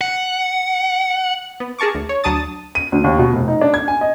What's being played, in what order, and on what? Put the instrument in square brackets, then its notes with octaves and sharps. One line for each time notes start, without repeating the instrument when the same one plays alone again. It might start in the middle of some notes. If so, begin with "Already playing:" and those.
[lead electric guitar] F#5
[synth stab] B3
G#4 A#4 A5 C#6 D6
D2
C#5
D2 F#3 D4 A5 D#6 A6
[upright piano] D#7
D2
D#2
B2
F1
D#4
D4
G#6
G#5
D#5